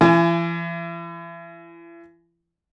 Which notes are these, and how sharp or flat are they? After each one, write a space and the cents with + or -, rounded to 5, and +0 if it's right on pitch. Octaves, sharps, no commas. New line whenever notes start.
E3 +40 E4 +40 G#5 +0